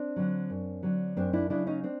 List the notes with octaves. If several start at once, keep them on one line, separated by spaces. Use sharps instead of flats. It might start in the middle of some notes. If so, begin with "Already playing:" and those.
Already playing: C4 D4
D3 F#3
F#2
D3 F#3
F#2 C4 D4
D4 E4
C#3 F#3 D4 E4
C#4 D#4
C4 D4